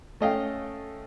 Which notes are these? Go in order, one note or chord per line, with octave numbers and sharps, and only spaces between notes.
A3 C#4 D#5 F5 G5